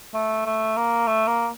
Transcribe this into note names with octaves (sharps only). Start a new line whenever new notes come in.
A3
A3
A#3
A3
A#3